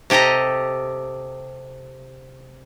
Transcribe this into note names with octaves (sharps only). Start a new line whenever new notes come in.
C3 G4 A4 D#5 A#5